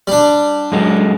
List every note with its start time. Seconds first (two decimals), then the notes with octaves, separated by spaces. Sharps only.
0.07 G3 D4
0.72 F#2 G#3